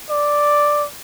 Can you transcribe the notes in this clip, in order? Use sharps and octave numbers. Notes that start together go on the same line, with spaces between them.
D5